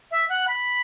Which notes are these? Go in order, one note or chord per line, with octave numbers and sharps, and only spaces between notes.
E5
F#5
B5